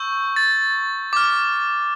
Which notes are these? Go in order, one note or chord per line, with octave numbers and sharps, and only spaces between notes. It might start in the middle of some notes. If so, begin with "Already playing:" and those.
Already playing: C#6 E6 G6
A6
D6 F6